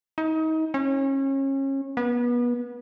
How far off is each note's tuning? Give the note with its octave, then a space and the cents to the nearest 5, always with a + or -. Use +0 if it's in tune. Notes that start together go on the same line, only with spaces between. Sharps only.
D#4 +30
C#4 -30
B3 -30